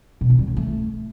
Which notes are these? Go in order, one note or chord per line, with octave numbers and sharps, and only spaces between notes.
B2
E3
G3
F#3
A3